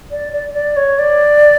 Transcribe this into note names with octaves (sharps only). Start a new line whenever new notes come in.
D5
D5
D5
C#5
D5